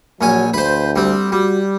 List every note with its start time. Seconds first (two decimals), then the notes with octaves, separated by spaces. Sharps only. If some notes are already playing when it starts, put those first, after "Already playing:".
0.21 A#1 F#3 C#4 G#5
0.54 D2 B4 C5
0.96 G3 C4
1.32 G3 F#4